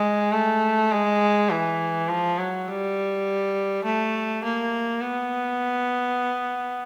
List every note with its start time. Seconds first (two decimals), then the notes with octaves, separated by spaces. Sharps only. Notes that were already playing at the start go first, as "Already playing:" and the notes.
Already playing: G#3
0.32 A3
0.91 G#3
1.51 E3
2.09 F3
2.38 F#3
2.68 G3
3.84 A3
4.44 A#3
5.02 B3